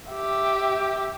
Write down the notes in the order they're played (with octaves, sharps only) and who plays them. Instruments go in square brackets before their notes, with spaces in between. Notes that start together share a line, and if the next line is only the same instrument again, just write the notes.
[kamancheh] G4 E5